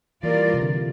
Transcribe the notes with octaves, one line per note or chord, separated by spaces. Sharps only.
E3 G3 A#3 F4 A#4 D5
C3
D3